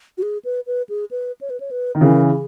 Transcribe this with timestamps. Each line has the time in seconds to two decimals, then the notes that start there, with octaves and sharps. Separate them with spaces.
0.18 F#4
0.22 G#4
0.45 B4
0.67 B4
0.89 G#4
1.11 B4
1.41 C#5
1.50 B4
1.60 C#5
1.71 B4
1.95 D#3
2.01 C#3 E3 A#4
2.31 G#4